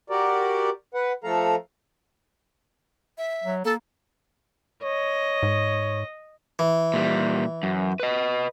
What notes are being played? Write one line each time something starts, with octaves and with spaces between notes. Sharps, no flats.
F#4 G4 A#4 D5
B4 F#5
F3 A3 A4 F5 A#5
E5
F#3
A#3 A4
C#5 D#5
G#2
E3
A#2 G3
F#2
B4 D#5